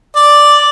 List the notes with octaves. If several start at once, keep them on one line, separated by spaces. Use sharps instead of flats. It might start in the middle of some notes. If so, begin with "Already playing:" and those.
D5